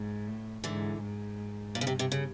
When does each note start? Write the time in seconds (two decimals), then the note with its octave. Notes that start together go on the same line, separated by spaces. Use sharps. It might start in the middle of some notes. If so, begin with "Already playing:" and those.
Already playing: G#2
0.27 A2
0.64 G#2 D3 E3
1.01 G#2
1.74 G2 A#2
1.81 C#3
1.87 C3
1.99 C3
2.12 C#3